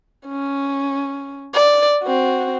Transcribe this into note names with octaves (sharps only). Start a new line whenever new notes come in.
C#4
D5
C4 F#4